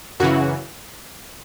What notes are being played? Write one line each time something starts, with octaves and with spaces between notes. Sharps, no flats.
F#2 C#3 E3 F#4